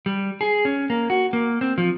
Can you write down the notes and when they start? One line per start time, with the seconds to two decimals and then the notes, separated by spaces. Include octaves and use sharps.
0.06 G3
0.41 G#4
0.65 C#4
0.90 A#3
1.10 F#4
1.33 A#3
1.61 C4
1.78 F3